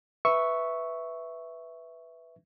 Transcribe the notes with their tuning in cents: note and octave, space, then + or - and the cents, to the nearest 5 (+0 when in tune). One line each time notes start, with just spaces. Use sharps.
B4 +0 E5 -5 C#6 +0